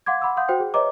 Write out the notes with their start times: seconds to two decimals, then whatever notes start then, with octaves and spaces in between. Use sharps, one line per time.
0.06 F5 F#5 C6 D6 G#6
0.22 F#5 B5 C6 D6 E6
0.37 F5 F#5 C6 D#6 G6
0.48 F#4 C5 G5 C6
0.60 G#4
0.74 B4 C#5 D#5 E5 A#5 D6